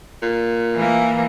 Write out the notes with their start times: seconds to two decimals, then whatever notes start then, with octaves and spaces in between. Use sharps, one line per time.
0.22 A#2
0.75 E3 A#3